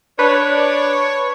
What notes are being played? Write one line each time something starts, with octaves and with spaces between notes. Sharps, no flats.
D4 B4 C#5